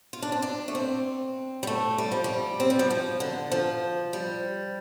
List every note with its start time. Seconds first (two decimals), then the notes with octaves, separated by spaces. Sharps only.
0.13 F4
0.22 D4
0.32 C4
0.42 D4
0.68 A3
0.75 C4
1.63 G3
1.67 A3
1.98 G3
2.12 F3
2.24 G3
2.60 C4
2.70 G3
2.79 F3
2.90 F3
3.20 D3
3.51 F3
4.13 G3